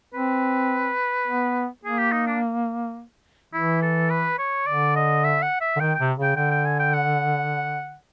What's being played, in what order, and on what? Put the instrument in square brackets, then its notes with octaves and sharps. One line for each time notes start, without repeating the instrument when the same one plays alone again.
[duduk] C4 [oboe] B4
[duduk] B3
[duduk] A#3 [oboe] G#4
[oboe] G4
D#4
D4
[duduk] E3 [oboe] E4
[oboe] A4
B4
C#5
[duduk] D3 [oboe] D5
[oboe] D#5
E5
F#5
E5
[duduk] D3
[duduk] D#3 [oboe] G5
[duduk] C3 [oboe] G5
[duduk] C#3 [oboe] G5
[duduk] D3 [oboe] G5
[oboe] G5
G#5
G5
F#5